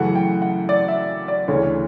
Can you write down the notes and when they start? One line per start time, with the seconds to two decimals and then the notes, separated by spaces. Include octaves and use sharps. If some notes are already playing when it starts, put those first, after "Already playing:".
Already playing: F#2 C#3 E3 A3 F#5
0.15 G5
0.42 F#5
0.69 D5
0.88 E5
1.28 D5
1.48 D2 C#3 E3 A3 C#5